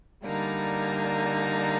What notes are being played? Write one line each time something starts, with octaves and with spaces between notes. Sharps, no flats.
D3 G3 A#3 D#4